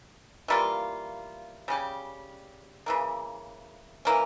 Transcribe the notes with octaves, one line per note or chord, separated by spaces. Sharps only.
E3 G3 A#3 F4
C#3 G3 C#4 G4
C#3 E3 A#3
E3 A#3 C#4